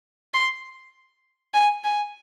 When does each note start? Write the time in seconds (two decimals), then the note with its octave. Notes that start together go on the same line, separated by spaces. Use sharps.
0.34 C6
1.54 G#5
1.84 G#5